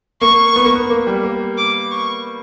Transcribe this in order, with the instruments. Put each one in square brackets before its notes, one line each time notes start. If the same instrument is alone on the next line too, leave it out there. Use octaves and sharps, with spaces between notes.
[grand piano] A#3 [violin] C#6
[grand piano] B3
A#3
B3
A#3
G3
A#3
[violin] D6
C#6